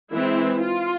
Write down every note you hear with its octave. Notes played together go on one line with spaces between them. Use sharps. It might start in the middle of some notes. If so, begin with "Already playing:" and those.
E3 G#3 C4 E4
F4